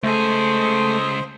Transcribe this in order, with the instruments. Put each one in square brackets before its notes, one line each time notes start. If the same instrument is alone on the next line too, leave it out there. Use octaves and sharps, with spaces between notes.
[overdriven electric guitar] C#2 G#4 [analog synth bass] A3 [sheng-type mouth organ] C5